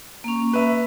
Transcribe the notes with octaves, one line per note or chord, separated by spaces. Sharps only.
A#3 C#4
B4 E5